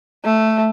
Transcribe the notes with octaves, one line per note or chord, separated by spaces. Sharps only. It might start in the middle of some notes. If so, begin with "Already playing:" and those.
A3